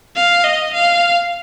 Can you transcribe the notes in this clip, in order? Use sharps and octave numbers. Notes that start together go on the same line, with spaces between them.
F5
D#5
F5